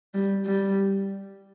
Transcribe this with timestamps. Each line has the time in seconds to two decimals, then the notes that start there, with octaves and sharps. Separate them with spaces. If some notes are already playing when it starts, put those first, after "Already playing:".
0.14 G3
0.45 G3